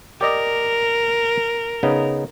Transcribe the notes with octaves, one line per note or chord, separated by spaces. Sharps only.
G4 A#4 D5 D#5
C#3 B3 D#4